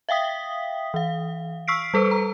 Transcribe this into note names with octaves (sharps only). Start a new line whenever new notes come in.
E5 F5 G5 D#6 B6
E3 F5
C#6 E6 F6 B6 C7 D7
G3 A4 B4 C5
A#5